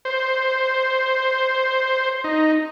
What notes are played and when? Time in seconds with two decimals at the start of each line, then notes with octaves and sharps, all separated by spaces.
0.05 C5
2.24 D#4